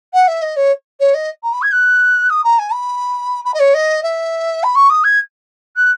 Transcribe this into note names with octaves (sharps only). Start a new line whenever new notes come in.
F#5
E5
D#5
C#5
C#5
D#5
A#5
B5
G#6
F#6
D#6
A#5
G#5
B5
B5
D#5
C#5
D#5
E5
B5
C#6
D#6
G#6
F#6